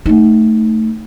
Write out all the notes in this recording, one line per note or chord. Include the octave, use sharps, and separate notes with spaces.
A3 D#4